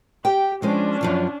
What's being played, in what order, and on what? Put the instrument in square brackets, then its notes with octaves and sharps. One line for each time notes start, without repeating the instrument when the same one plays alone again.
[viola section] G4 [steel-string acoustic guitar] G5
[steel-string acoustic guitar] F3 G#3 C5 [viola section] C#4 D4
[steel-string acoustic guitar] F#2 F3 F4